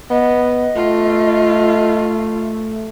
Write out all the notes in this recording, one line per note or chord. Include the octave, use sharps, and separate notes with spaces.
B3 D#5
A3 F4